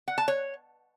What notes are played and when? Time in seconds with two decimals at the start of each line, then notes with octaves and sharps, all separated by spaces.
0.08 F#5
0.18 A5
0.28 C#5